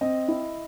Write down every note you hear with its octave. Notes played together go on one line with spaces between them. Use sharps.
C4 D#5
E4